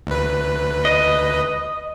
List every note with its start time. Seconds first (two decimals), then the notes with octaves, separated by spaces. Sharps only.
0.07 D2 B4
0.85 D#5